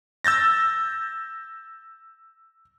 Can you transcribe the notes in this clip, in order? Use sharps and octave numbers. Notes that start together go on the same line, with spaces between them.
E6 G6 A6 A#6